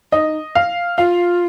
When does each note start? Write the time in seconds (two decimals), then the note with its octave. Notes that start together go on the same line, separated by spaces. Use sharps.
0.12 D#4 D#5
0.55 F5
0.98 F4 F5